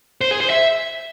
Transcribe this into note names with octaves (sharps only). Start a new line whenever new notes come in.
C5
G#4
C5
E5